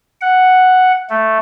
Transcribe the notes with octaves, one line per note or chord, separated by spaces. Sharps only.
F#5
A3